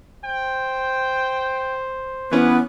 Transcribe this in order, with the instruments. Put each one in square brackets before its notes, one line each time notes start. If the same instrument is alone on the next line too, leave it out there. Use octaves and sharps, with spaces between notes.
[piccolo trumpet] C5 [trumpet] G5
[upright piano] E3 C#4 [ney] B3 [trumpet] B4